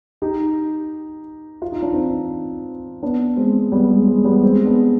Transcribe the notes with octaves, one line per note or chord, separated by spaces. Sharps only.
D#4 G4
F4
D#4
D4
C4 D#4
B3 D4
G#3 C4
G3 B3
G#3
G#3
G3 B3
G#3 C4
B3 D4